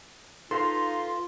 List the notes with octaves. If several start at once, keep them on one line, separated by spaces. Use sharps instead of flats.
D#4 F4 A4 B4 F5 C6